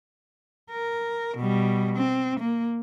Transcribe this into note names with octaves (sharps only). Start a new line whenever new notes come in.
A#4
B2 G3
C4
A#3